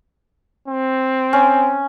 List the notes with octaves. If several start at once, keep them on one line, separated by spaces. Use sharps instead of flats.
C4
C#4